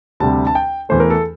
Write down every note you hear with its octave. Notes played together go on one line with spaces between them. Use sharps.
D2 C3 G3 A5
A5
G5
E2 E3 A3 C5
A#4
A4